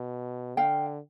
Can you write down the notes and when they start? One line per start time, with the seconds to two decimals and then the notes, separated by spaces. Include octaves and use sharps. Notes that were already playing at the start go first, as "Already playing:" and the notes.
Already playing: B2
0.57 D3 F5 G5